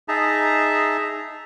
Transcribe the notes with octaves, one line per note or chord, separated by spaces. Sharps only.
D#4 G#4 E5 A5 A#5